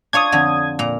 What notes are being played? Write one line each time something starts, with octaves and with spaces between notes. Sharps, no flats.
D4 F4 C#5 D#6 G#6
F2 D3
A#2 A#5